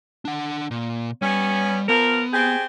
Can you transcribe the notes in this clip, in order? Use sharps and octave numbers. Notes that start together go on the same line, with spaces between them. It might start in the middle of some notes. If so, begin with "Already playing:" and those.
D4 F#5
A#2
G3 B3 C#4
F3 B3 A#4
C4 G4 G#4